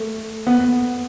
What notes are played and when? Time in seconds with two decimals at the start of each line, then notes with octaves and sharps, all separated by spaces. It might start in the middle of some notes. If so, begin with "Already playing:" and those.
Already playing: A3
0.47 B3